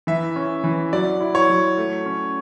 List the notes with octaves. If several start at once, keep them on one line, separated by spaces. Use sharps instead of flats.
E3 E5
C#4
E3
F#3 D5
E4
C#5
F#3
A3
C#4